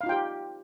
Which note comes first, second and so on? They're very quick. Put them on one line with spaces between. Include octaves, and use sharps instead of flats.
F5 D#4 F4 G5 G4